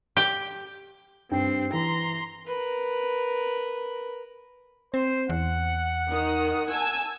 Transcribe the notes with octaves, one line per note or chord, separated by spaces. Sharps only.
G4
G2 C4 G5 C7
E3 A#5 C6
A#4 B4
C4 C5
E2 F#5
D#3 D#6
G#5 A5 E6